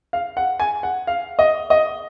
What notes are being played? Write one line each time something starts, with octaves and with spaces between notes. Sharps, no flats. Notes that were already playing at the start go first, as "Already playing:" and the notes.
F5
F#5
G#5
F#5
F5
D#5
D#5